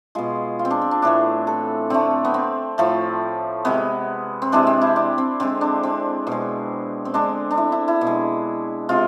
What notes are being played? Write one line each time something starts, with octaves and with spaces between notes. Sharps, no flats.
B2 G#3 F4
F4
C4
D4
C4
D4
A2 E3 A3 D4
A4
D3 A3 C4
B3
C4
A2 F3 A3
C3 G#3 B3
C4
C3 E3 G#3 D4
C4
E4
D4
C4
D3 G#3 C4
D4
C4
B2 G#3
C4
D3 G#3 D4
D4
E4
E4
E4
B2
G#3
C3 G#3 F4